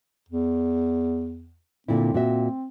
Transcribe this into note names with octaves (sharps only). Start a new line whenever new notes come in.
E2
A#2 D3 C4 E4
A#2 F#4 E5